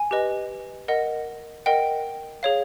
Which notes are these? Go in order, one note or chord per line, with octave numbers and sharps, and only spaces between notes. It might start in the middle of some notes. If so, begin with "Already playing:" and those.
Already playing: G#5
G4 B4 D#5
A#4 D#5 F#5
A#4 D#5 F#5 G5
G#4 C#5 F5